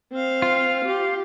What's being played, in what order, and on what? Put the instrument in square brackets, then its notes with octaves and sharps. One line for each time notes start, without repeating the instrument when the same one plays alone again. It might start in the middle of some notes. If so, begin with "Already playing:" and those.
[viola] C4 F5
[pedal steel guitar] F4
[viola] G4